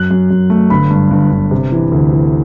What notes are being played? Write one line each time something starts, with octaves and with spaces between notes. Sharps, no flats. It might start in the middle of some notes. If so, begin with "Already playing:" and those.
Already playing: F#2 F#6
F#2
F#2
A3
G1 B5
G2
G1
G1
C3
E3
D2
E3